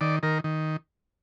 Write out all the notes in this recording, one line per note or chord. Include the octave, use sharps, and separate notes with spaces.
D#3 D5
D#3 A#4
D#3